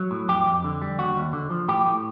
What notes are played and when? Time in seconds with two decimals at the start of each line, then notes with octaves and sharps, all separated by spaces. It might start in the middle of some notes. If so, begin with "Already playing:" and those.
Already playing: F#3
0.11 A2
0.28 F2 G4
0.46 F2
0.64 D3
0.82 G3
0.98 D#2 F#4
1.16 D#2
1.33 D3
1.50 F3
1.68 A2 G4
1.86 A2